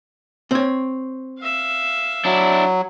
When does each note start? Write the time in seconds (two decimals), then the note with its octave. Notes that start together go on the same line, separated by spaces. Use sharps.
0.51 C4 C#5
1.39 E5 F5
2.25 F#3 D4 E4